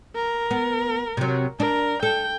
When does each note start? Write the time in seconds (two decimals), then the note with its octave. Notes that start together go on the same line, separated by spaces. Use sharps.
0.15 A#4
0.51 B3
1.17 C3 F#3
1.60 D4 A#4
2.03 A4 G5